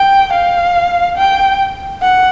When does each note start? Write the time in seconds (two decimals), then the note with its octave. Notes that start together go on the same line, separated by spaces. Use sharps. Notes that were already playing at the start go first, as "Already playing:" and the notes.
Already playing: G5
0.33 F5
1.17 G5
2.02 F#5